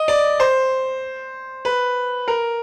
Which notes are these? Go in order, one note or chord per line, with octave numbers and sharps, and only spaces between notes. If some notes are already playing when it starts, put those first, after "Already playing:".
Already playing: D#5
D5
C5
B4
A#4